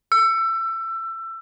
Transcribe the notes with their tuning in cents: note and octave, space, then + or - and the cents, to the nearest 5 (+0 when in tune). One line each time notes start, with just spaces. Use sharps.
E6 +25